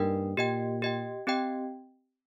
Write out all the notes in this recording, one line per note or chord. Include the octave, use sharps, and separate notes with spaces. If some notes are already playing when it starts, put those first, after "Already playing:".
Already playing: G2 A#3 D#4 A#4 G5
A#2 G4 D#5 G5
G4 D#5 G5
C4 G4 D#5 G5